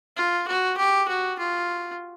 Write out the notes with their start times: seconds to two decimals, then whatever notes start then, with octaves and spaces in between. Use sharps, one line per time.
0.16 F4
0.47 F#4
0.77 G4
1.08 F#4
1.38 F4